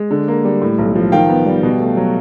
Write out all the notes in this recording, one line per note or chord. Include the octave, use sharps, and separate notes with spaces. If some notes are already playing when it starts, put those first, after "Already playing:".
Already playing: G#3
D3
A#3
G3
A2
B1
F3
D#3 F5 G5
B3
G3
B2
A3
F#3